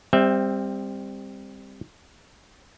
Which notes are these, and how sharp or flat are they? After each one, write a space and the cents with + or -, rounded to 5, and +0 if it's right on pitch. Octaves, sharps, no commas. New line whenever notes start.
G3 +25 C4 +0 E5 -5